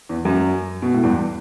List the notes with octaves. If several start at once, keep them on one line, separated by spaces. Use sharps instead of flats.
E2
F#2
B2
A2
E2 G2